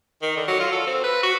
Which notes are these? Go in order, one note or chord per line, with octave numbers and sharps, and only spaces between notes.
D#3
D3
F#3
F4
A4
C4
B4
F#4